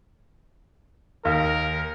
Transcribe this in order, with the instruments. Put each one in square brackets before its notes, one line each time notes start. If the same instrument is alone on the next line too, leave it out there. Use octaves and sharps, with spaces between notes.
[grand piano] D#2 [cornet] A#4